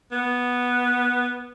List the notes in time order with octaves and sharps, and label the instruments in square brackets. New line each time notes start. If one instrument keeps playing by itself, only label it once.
[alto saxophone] B3